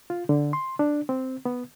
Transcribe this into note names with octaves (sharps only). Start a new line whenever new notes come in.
F4
D3
C6
D4
C4
B3